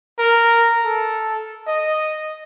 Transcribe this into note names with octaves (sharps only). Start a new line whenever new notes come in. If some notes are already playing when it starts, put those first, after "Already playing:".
A#4
A4
D#5